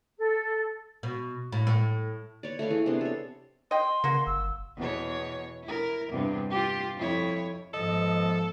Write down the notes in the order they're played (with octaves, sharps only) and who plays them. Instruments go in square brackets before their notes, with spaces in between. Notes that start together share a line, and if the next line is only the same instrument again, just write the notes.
[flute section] A4
[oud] B2
A2
A2
[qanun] B4 C#5 D5
A3 B4 C#5 F5
E3 G#4
C3 B3 D4 C6
A4 C#5
[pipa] D#5 G5 [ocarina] C6
[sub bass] C#3 [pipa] A#3 F#4
[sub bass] G1 [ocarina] E6
[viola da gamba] E2 B2 C#5
E4 A#4
E2 G2 C3
F4 G4
F2 E4 C#5
[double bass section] G#1 G#2 B3 [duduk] F3 [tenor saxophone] A4 [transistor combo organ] D#5